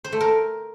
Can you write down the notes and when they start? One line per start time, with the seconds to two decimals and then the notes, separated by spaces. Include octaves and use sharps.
0.04 C5
0.13 A3
0.21 A#4